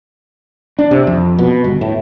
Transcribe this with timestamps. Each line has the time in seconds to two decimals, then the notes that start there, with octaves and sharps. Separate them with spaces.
0.79 D4
0.91 C3
1.07 F2
1.39 B2
1.64 G1
1.81 A2